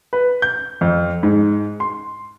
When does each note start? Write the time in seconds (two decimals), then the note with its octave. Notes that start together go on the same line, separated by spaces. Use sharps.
0.13 B4
0.42 G6
0.81 F2
1.23 G#2
1.80 C6